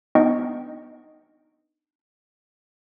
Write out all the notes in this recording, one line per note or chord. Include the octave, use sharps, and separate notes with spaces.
B3 D4 D#4 D#5 G5 C#6